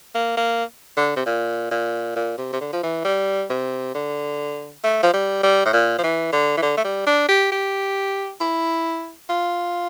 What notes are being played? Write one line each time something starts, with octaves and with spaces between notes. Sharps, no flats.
A#3
A#3
D3
C3
A#2
A#2
A#2
C3
C3
D3
F3
E3
G3
C3
D3
A3
F3
G3
G3
A2
A#2
F3
E3
D3
E3
D3
A3
G3
D4
G4
G4
E4
F4